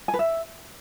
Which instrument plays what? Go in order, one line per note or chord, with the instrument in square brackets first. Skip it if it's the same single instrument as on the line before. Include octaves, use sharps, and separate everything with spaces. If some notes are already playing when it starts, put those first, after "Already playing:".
[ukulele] G#5
B4
E5